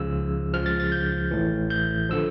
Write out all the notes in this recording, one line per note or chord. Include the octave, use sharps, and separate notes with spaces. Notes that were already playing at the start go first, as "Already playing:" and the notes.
Already playing: C#2 C#3 F3 E6
C#2 C#3 F3 F6
A6
A6
G6
A1 A2 E3
G6
D3 F3 E6